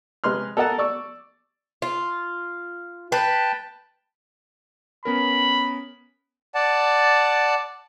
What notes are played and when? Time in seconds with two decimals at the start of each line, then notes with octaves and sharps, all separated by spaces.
0.24 C3 G#3 B4 C6 F6
0.57 A4 A#4 D#5 F#5 A5
0.78 D5 C#6 E6
1.82 F4
3.12 B4 G5 A5
5.05 B3 C#4 A#4 B5
6.55 D5 F#5 A5